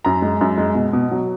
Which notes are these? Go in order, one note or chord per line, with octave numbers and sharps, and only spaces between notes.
F#2 A#5
G#3
F#2
G#3
B2
B2
F#3